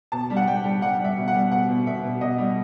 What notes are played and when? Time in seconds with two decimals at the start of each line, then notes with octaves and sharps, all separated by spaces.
0.12 B2 A5
0.30 G3
0.36 F#5
0.47 G3 G5
0.64 G3
0.81 G3 F#5
0.99 G3
1.04 E5
1.17 B2
1.28 F#5
1.34 G3
1.51 B2 F#5
1.69 B2
1.86 B2 E5
2.04 B2
2.21 B2 D#5
2.38 G3